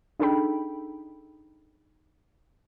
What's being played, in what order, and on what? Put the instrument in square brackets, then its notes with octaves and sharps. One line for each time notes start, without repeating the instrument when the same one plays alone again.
[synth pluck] D4 D#4 G#4 A4 G5 B5